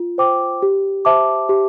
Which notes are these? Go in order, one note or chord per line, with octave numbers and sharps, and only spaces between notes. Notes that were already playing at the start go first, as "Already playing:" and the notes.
Already playing: F4
C5 G5 D6
G4
C5 E5 A5 D6
G4